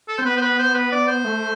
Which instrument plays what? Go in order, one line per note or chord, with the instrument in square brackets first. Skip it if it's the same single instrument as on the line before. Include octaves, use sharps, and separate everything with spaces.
[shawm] A4
[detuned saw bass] C4 [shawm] C5
[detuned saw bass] B3 [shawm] B4
[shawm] C5
B4
C5
B4
D5
C5
[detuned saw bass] A3